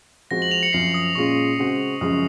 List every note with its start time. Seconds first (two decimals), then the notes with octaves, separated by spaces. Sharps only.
0.31 F3 G#3 C4 F#4 A#6
0.42 F#7
0.51 F7
0.63 C#7
0.73 F#2 F3 C4 C7
0.94 D#6
1.15 A#2 G#3 C#4 F4 G#4 C#6
1.59 C#3 G#3 C4 F#4
2.01 F#2 C#3 F3 G#3 D#6